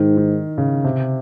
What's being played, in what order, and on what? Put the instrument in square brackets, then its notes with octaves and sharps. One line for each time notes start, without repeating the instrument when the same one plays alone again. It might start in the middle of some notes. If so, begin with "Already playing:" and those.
Already playing: [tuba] G#2 [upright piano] D#3
[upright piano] D#3
C#3
C3